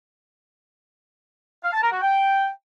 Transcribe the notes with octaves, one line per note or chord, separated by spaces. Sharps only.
F5
A5
A#4
F#4
G5